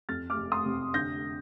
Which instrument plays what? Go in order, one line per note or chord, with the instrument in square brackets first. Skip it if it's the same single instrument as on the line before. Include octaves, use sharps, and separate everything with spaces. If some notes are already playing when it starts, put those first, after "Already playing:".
[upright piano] F2 F6 A6
D6 F6
F1
C6 D#6
C3
D3 G6 A#6